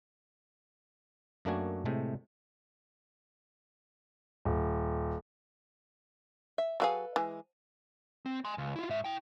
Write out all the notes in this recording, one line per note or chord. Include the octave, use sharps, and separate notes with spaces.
F#2 A3 A#3 D4 F#4 G#5
A2 C3 G#3 A3
D#1
E5
F#3 F#4 G#4 A4 B4 F5
E3 G#3
C4
G#5 C6
C#2
E4 F4
G#2 E5
E4 G5